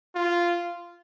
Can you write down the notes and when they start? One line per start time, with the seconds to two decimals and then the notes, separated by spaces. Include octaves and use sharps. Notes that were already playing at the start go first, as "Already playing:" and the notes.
0.16 F4